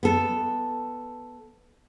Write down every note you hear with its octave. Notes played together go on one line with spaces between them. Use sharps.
B3 A4